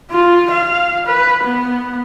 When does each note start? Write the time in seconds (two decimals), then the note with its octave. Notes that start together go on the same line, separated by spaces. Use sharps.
0.11 F4
0.51 F5
1.07 B4
1.44 B3